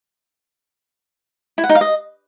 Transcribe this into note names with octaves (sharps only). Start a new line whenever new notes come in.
E4
F#5
D#4
F5
D#5